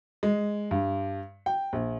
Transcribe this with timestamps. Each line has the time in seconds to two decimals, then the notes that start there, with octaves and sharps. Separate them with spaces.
0.23 G#3
0.71 G2
1.46 G5
1.73 A#1